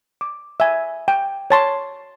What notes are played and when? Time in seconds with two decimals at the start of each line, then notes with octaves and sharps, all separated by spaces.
0.21 D6
0.60 E5 G#5
1.08 G5
1.50 C#5 A5 C6